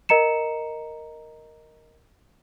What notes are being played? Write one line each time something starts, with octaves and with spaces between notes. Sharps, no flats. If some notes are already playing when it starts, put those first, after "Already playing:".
A#4 D#5 A#5 C#7 E7